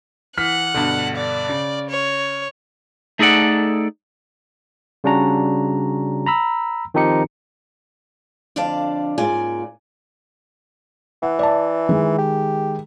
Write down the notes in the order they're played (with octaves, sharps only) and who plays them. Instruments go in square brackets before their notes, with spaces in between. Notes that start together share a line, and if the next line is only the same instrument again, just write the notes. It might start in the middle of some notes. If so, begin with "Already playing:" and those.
[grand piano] E3 F6 B6 [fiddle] F#5
[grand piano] G2 B2 D3
[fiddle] D5
[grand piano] C#3
[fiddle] C#5
[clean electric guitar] A3 D#4 G#4 A4 D5 F#5
[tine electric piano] C#3 G3 C#4 D4 F#4 A#5
A#5 B5 E6
D#3 F3 C4 D#4 G4 C#7
[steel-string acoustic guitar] F2 D3 D4 D5 F5 A5
G#2 C#3 A#3 F4 D5 G#5
[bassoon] E3 [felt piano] F#5
[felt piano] D5 E5 A5
D#3 G#3
[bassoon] G4